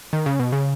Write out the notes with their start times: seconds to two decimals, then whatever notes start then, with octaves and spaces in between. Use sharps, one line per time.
0.13 D#3
0.26 C#3
0.39 B2
0.52 C#3